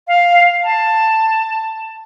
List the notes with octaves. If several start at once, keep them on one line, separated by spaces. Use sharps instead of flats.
F5
A5